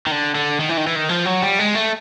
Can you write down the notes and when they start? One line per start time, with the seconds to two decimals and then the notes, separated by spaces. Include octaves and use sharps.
0.07 D#3
0.11 D3
0.35 D3
0.60 D#3
0.69 E3
0.78 D#3
0.87 E3
0.96 D#3
1.09 F3
1.25 F#3
1.43 G3
1.59 G#3
1.75 A3